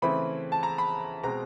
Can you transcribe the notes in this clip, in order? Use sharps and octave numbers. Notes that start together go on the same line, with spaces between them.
C#3 E3 A3 C4 B5
A5
A#5
B5
B2 G#3 C4 A#5